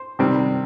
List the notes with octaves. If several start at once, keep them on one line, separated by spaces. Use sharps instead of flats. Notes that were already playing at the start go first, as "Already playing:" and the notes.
Already playing: C5
C3 D#3 G3 C4